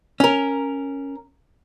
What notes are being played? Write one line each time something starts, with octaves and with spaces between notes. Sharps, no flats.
C#4 A#4